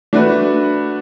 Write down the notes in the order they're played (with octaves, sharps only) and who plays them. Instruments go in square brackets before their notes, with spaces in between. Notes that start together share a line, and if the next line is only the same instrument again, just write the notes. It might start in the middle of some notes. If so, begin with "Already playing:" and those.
[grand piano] A3 D4 F#4 B4